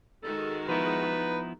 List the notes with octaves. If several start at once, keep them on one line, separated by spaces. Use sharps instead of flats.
D#3 G#3 F#4 A4
F3 B3 D#4 E4 B4